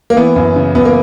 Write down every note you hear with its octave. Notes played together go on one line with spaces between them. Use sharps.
A#3
E3 B3
F#2
C#3
F#2 B3
A#3